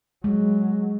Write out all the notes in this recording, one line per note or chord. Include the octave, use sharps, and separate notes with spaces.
F#3 G#3